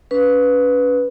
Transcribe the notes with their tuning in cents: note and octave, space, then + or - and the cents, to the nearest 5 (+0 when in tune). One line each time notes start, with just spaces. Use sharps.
C#4 +30 B4 +0